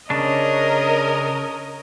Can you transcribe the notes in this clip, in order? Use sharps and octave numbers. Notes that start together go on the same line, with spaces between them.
C#3 C#4 D4 A#4 C#5 D#5